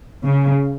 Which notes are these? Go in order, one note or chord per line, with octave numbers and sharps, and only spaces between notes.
C#3